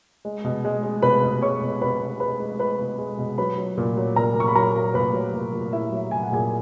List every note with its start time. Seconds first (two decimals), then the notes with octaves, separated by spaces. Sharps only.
0.25 G#3
0.45 B2
0.65 G#3
0.83 G#3
1.03 B2 B4 B5
1.23 B2
1.42 G#3 C#5 C#6
1.61 B2
1.81 B2 B4 B5
2.00 B2
2.20 G#3 B4 B5
2.40 G#3
2.59 G#3 B4 B5
2.79 B2
2.98 G#3
3.19 B2
3.38 F#3 B4 B5
3.58 F#3
3.78 A#2
3.97 F#3
4.16 A#2 A#4 A#5
4.35 A#2
4.40 C#6
4.48 B5
4.55 F#3 A#4 A#5
4.75 F#3
4.94 A#2 B4 B5
5.13 F#3
5.34 A#2
5.53 A#2
5.72 F#3 E4 E5
5.92 F#3
6.11 A#2 G#5
6.23 F#5
6.32 A#2 G#4 G#5